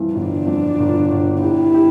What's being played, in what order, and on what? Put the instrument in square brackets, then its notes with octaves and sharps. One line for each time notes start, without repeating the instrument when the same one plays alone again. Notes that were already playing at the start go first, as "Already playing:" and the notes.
Already playing: [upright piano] F2 E3 G3
[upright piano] G1 [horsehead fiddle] D4
[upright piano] F2
G1
G1
[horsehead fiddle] E4 [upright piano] G4
[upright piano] G4